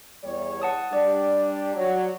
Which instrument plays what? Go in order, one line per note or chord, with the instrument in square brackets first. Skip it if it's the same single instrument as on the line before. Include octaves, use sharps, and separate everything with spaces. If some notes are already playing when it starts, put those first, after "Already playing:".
[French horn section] E2 G3 C#5
[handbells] F#5 A5 D#6
[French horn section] G3 D4 [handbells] D5
[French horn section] F#3